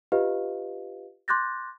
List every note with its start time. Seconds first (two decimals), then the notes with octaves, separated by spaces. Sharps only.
0.12 F4 G4 B4 D#5 F5
1.28 C6 D6 F#6 G6 A6 A#6